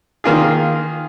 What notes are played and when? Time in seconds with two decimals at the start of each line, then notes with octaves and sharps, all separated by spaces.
0.24 D#3 A#3 F4 G#4